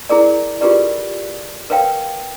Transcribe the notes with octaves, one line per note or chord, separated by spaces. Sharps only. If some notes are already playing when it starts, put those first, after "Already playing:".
E4 G#4 A#4 D5
F4 G4 G#4 A#4 B4 D5
A#4 B4 C#5 F5 G5